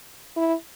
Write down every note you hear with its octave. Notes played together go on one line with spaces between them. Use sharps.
E4